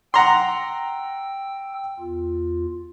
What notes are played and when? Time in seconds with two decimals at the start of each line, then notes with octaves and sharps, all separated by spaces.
0.14 F#5 G5 A#5 C6 E6
2.00 E2 F4